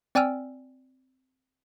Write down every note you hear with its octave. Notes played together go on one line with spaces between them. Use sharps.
C4 D5 G5 G#5 E6 F6